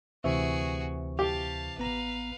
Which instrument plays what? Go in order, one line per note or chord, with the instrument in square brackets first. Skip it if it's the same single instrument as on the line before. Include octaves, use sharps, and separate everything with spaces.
[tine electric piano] D2 C#6 [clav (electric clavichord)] C3 E3 E5 [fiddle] F#4 G#4
[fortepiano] G4 [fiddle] F5 A5
[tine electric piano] A1 B3 A#5 [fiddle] B4 F5